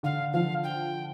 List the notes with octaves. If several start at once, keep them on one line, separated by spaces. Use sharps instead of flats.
D3 F5
F3 F5
G5